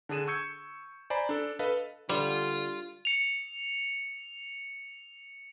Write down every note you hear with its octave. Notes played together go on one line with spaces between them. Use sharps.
D3 D4 G#4 D#7 E7
C#6 E6 G6 G#6 C#7
C5 D5 G#5 A#5 B5
D4 A4
A4 B4 D#5 F5
D3 G3 F4
C#7 F7